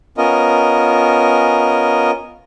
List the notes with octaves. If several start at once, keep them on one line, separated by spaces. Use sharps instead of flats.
B3 C#4 F4 A#4 D#5